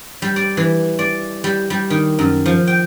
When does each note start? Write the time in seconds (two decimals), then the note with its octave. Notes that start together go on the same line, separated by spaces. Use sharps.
0.22 G3
0.36 D5
0.57 E3
0.99 D5
1.44 G3
1.70 G3
1.90 D#3
2.19 F#2
2.46 F3
2.67 G5